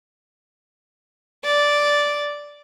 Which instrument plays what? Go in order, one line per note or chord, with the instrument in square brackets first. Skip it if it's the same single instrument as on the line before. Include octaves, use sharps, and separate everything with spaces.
[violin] D5